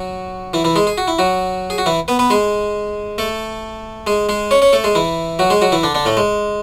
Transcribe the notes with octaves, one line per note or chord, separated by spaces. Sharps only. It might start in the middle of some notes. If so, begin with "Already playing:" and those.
Already playing: F#3 F#4
E3 E4
E3 E4
G#3 G#4
G#4
F#4
E4
F#3 F#4
G#4
F#4
E3 E4
B3 B4
B3 B4
G#3 G#4
A3 A4
G#3 G#4
G#3 G#4
C#4 C#5
C#4 C#5
A3 A4
G#3 G#4
E3 E4
F#3 F#4
G#3 G#4
F#3 F#4
E3 E4
D3 D4
D3 D4
A2 A3
G#3